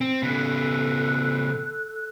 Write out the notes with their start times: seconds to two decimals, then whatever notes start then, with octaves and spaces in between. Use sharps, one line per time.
0.01 C4
0.23 C#3 B3 A4 F#6